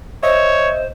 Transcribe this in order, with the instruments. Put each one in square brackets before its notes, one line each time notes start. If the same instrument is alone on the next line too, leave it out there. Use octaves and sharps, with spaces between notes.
[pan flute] C5 [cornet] C#5 [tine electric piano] D#5 E5